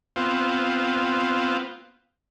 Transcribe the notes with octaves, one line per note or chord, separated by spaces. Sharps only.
B3 C4 F4